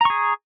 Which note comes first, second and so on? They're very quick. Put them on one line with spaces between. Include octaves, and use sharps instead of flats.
A#5 C#6 G#4